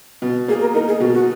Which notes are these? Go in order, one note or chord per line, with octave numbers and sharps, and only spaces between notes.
B2
A#3 G#4
A#4
D#4 A#4
G#4
B2 F#4
F#4